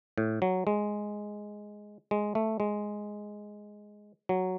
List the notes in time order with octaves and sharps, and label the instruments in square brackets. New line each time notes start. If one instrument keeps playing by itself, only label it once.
[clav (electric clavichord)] A2
F#3
G#3
G#3
A3
G#3
F#3